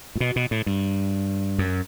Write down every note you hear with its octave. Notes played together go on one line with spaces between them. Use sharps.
A2
B2
B2
A2
G2
F#2